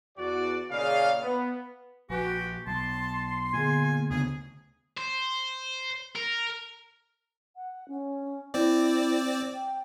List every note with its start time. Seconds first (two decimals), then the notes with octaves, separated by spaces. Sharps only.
0.18 E2 F#4 D5
0.72 A#2 C#3 G#4 D5 D#5 F5
1.22 B3
2.10 A#1 F#4 G4 B4 G#5
2.67 B1 A5 C6
3.54 A#2 D3 B3 G#4 G#5
4.11 D2 C#3 B3 G#4
4.97 C5
6.15 A#4
7.56 F#5
7.88 C#4
8.54 C4 E4 D5
9.54 G5